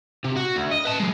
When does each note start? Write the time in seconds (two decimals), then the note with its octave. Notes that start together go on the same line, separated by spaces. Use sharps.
0.25 C3
0.37 F#4
0.56 D2
0.71 D#5
0.85 B4 A5
1.00 F#3 G#3